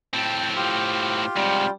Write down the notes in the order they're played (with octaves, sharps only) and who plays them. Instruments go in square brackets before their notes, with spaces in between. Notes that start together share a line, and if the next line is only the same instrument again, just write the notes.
[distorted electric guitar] A2 C4 [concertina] G5 A5
[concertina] F4 G4
[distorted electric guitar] G#2 C3 [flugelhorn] G3